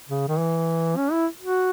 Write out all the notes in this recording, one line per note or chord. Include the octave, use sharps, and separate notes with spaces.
C#3
D#3
E3
C#4
E4
F#4